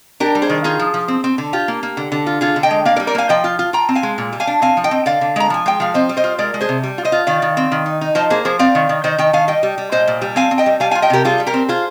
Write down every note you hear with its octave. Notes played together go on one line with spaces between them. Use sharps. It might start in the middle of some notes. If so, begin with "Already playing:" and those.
D4 G4 A#4
G3
G#4 C5
D#3
D#4 F4 G#4
F3
F3
C4
C4
D3
F4 G4
A#3
A#3
D3
D3
F4
D3 F4 G#4
D3
D#5 G5
G#3
A#3 D5 F5
A#4 D5
G3
A#4 D5
A#3 F5 G#5
F3 D#5 G5
F4
F4
F4 G5 A#5
C4
F5 G#5
G#3
A#2
G3
F5 G#5
D4
C4 F5 G#5
F3
D#5 G5
C4
D3 D5 F5
D3
G#3 A#5
F3 G#5
G#3 G5
F3 F5
C4 C5 D#5
G3
C5 D#5
F4
G#3 A#4 D5
G#3
G#4 C5
C3
G3
F4
C5 D#5
F4
D#3 D5 F5
D#3
C4
D#3
D#4
D#4
F3 C5 D#5
A#3 G#4 C5
F3 G#4 C5
C4 D5 F5
D#3
D#3
D#3 C5 D#5
D#3 D#5 G5
D#3 F5 G#5
G3 D#5 G5
G3
G3
A#2 C5 D#5
A#2
G3
C4 F5 G#5
C4
D#5 G5
G3
G3 F5 G#5
F5 G#5
F4
D#5 G5
C3 G4 A#4
G3 F4 G#4
G3
G4 A#4
C4
F4 G#4 C5